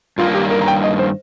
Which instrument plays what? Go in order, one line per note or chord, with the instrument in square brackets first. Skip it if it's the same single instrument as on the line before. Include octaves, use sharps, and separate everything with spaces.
[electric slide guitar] G2 D#3 A#3 [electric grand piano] F4
[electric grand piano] G4
A#4
A#5
G5
D#5
C5